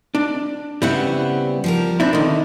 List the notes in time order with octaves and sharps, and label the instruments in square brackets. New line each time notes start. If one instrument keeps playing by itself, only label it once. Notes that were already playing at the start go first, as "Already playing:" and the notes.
[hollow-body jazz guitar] D4
[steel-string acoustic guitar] C#3 B3 C4 [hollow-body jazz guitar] G3 E4 F#5
[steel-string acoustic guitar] F3 G3 A#4
[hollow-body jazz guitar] C4 D4 E4
[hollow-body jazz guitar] D3 D#3 [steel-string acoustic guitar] B3